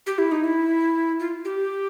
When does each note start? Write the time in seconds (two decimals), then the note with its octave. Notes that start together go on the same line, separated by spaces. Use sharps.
0.07 G4
0.18 E4
0.32 D#4
0.44 E4
1.20 F4
1.45 G4